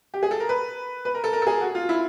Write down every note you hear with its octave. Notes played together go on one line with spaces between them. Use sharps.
G4
G#4
A4
A#4
B4
B4
A#4
A4
A#4
A4
G#4
F#4
F4
E4